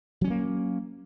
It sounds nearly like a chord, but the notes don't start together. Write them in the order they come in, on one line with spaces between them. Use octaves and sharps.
F#3 C#4 G3 A#3